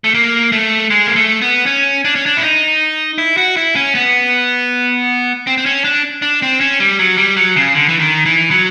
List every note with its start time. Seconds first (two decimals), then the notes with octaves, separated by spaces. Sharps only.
0.04 A3
0.14 A#3
0.52 A3
0.90 G#3
1.06 A#3
1.16 A3
1.42 B3
1.66 C#4
2.05 D4
2.16 C#4
2.26 D4
2.37 E4
2.42 D#4
3.18 E4
3.37 F#4
3.57 E4
3.75 C#4
3.95 B3
5.47 C4
5.58 C4
5.66 C#4
5.85 D4
6.22 D4
6.42 C4
6.61 C#4
6.80 G3
6.99 F#3
7.17 G3
7.37 F#3
7.56 C#3
7.75 D3
7.89 E3
8.00 D#3
8.26 E3
8.51 F#3